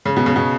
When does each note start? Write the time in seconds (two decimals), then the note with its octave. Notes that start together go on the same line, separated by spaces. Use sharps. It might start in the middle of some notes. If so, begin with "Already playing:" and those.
0.06 C#3
0.17 B2
0.26 C#3
0.36 B2